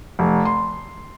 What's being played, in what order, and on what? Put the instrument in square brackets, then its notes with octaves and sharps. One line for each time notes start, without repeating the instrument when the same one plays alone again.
[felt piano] F1
C6